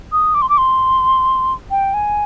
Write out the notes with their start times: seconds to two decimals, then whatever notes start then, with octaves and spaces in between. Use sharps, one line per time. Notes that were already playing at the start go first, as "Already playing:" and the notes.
0.12 D#6
0.34 D6
0.42 C6
0.49 D6
0.58 C6
1.71 G5
1.94 G#5